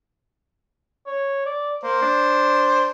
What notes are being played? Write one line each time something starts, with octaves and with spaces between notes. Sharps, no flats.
C#5
D5
A#3 C5
D4